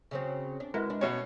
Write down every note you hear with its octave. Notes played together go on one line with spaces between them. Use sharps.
C#3 F#3 C4
D4
G#3 E4 F#4 A#4 B4
D4
B2 C#4 C#5 E5